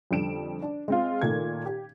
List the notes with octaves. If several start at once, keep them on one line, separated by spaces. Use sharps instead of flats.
F2 D3 G3 D7 E7
D4
G#3 C4 F4
A#2 D#3 A3 G#6
G4